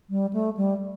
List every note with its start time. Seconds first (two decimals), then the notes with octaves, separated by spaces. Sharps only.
0.10 G3
0.33 A3
0.57 G3